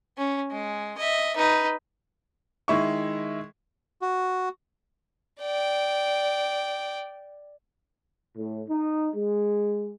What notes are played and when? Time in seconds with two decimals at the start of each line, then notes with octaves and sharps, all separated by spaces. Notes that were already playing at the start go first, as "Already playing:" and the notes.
0.18 C#4
0.52 G#3
0.98 D#5 E5
1.37 D#4 B4
2.68 D#3 G#3 E4 C#6
4.02 F#4
5.41 D5 G5
8.36 A2
8.69 D#4
9.15 G#3